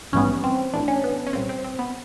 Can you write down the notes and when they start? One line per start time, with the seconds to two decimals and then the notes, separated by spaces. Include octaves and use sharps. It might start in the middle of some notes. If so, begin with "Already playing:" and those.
0.12 A#1 G#2 E3 G3 B3 C#4
0.44 C4
0.73 A#1 A2 E3 D4
0.88 C#4
1.04 B3
1.27 C#4
1.33 C2 A#2 G3 C4
1.49 C4
1.64 C4
1.79 B3